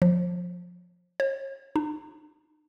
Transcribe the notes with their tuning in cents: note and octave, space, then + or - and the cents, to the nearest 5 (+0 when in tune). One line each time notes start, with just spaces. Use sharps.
F3 +20
C#5 -40
D#4 -40